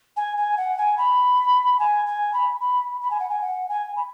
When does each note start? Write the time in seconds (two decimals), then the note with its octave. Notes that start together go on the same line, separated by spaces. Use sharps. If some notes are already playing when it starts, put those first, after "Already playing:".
0.16 G#5
0.37 G#5
0.57 F#5
0.78 G#5
0.97 B5
1.79 G#5
2.06 G#5
2.33 B5
2.60 B5
3.01 B5
3.10 G#5
3.19 F#5
3.29 G#5
3.41 F#5
3.69 G#5
3.96 B5